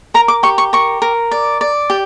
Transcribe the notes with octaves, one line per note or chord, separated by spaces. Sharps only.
A#4 A#5
D6
G4 C#6
C#6
A#4 C#6
A#4
D5
D5
G4